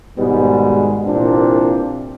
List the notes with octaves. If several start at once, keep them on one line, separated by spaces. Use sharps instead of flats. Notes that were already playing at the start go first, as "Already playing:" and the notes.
G#1 G#2 B2 G3 G#3 B3
C2 A#2 E3 C4 D4